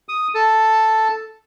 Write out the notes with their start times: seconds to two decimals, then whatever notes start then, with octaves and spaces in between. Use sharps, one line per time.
0.09 D#6
0.35 A4